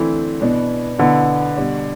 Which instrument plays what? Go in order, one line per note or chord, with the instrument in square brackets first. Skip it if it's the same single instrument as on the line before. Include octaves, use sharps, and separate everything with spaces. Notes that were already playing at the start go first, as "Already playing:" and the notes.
Already playing: [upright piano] D3 A3 C4 E4 [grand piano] E3
[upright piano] B2 B3 D4
[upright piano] B2 B3 E4 [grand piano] D3
[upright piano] B2 G3 D4